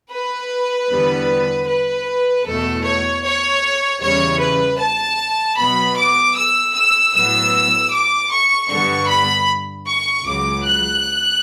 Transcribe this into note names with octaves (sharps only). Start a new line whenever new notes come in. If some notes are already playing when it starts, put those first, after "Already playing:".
B4
E2 D3 G3 B3
B4
E2 B2 A3 A4
C#5
C#5
E2 C#3 E3 G3 C#5
B4
A5
B2 F#3 B3 B5
D6
E6
E6
A2 F#3 B3 E6
D6
C#6
G2 D3 G3 B3 C#6
B5
C#6
C#2 C#3 F#3 D6
F#6